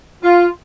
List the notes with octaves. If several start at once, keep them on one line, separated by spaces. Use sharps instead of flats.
F4